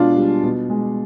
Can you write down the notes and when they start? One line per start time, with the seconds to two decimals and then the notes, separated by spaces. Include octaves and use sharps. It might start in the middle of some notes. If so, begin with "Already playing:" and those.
Already playing: B2 G#3 D4 F4
0.16 G3
0.43 B2
0.70 G#3